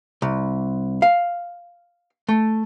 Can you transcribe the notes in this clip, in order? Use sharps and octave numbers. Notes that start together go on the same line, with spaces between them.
C2
F5
A3